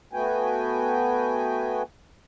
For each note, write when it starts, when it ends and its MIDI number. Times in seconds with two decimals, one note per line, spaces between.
0.13 1.83 57
0.13 1.83 59
0.13 1.83 66
0.13 1.83 71
0.13 1.83 79
0.13 1.83 80